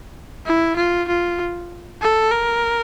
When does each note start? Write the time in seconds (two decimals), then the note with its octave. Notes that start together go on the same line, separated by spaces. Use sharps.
0.46 E4
0.76 F4
1.08 F4
2.02 A4
2.32 A#4